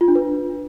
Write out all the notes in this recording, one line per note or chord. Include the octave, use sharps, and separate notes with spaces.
F4
D4
B4